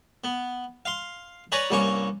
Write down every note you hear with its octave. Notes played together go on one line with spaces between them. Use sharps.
B3
F5 C6
B4 C#5 D5 G#5 A#5
C2 G2 A#3 C#4 C#5 C#6